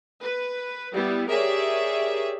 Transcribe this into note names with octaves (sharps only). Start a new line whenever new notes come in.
B4
G3 B3 E4
G4 G#4 A#4 C#5 D5 E5